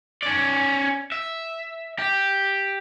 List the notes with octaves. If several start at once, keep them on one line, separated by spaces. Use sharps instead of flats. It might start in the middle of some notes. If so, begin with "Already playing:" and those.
C#4 D5
E5
G4